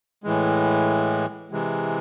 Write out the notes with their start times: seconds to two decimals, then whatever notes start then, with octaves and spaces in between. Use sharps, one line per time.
0.24 A2 E3 G#3
1.52 C3 E3 G#3